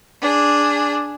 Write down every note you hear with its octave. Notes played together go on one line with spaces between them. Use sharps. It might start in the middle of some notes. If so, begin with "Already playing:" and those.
D4 G#4